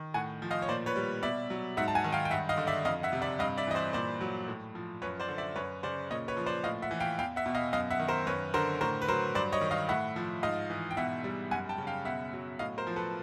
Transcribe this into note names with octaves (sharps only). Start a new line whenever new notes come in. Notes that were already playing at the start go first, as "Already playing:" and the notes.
Already playing: D#3
A2 F#5 G#5
F3
D#5 F5
C#5
A#2 C5 D5
B4 C#5
G3
B2 D5 E5
F#3
G#2 E5 F#5
A5
F#5 G#5
D#3
F5 G5
G5
G2 E5 F#5
D#5 F5
D3
D5 E5
F2 D#5 F5
E5 F#5
C3
D5 E5
G2 D#5 F5
D5 E5
E3 D#5
C5 D5
A#2 C5 D5
F#3
A2
F3
F#2 B4 C#5
C5 D5
D3
D5 E5
F#2 B4 C#5
C#3 C5 D5
A#2 C#5 D#5
B4 C#5
F3
C5 D5
A2 D#5 F5
E5 F#5
E3
F5 G5
E2 F5 G5
E5 F#5
B2
D#5 F5
F#2 D#5 F5
E5 F#5
D#3
A#4 C5
F#2 B4 C#5
D3 A#4 C5
A2 A#4 C5
B4
F#3 A#4 C5
G2 C5 D5
C#5 D#5
D#3
D#5 F5
A2 E5 F#5
F3
G#2 D#5 F5
E3
G5
B2 E5 F#5
G3
F#2 F#5 G#5
G5 A5
C#3
F5 G5
B2 E5 F#5
F#3
A2 D#5 F5
A#4 C5
F3
A4 B4